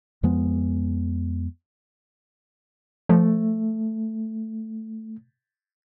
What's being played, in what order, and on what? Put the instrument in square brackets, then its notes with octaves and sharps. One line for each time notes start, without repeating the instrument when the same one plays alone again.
[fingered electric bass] F2 F3 G#3 B3
[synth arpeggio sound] F3 [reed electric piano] A3